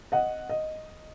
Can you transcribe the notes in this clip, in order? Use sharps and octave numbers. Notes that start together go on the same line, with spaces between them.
D#5 F#5
D#5